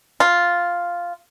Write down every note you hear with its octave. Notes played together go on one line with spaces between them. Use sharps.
F4